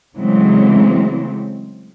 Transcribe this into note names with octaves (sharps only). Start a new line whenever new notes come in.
C#3 E3 F#3 G#3 A3 C4